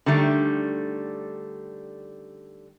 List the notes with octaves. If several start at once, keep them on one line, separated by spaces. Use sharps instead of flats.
D3 D#3 G3 A3